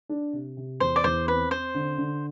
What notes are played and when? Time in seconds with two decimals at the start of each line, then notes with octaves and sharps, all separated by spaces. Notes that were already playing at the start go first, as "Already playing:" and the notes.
0.09 D4
0.33 C3
0.57 C3
0.80 E2 C5
0.96 D5
1.04 E2 C5
1.27 C4 B4
1.51 C4 C5
1.74 D3
1.98 D3